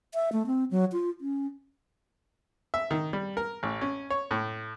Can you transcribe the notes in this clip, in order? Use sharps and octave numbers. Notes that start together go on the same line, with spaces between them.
E5
A3
C4
F#3
F4
C#4
E5
D#3
G3
A#4
A1
C#4
C#5
A2